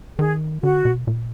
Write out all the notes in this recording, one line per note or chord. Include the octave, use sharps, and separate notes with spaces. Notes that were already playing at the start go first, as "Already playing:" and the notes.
D#3 G#4
D3 F#4
B2
A#2